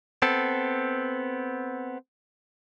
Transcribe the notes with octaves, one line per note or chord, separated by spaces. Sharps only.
B3 C4 A4